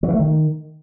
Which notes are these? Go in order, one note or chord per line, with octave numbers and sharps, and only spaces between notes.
F#3
E3
A3
D#3